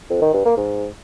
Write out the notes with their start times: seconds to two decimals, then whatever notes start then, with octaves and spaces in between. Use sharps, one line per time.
0.10 F2
0.22 D#3
0.34 G2
0.45 A#3
0.57 G#2